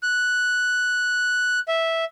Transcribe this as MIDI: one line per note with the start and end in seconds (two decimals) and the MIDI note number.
0.03 1.59 90
1.68 2.04 76